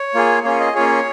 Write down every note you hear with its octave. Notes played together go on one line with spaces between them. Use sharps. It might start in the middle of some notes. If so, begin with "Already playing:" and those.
Already playing: C#5
A#3 F4 G#4
A#3 C#4 F4 G#4 C#5
D#5
A#3 C#4 F4 G#4 C#5